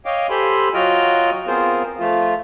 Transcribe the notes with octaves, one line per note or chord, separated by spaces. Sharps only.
C#5 D#5 F5 G5 D6
G4 A4 C5 G#5 B5 C6
F#3 F4 F#4 D#5 G5 F6
B3 C4 F4 G#4 A#4 C5
F3 A3 F4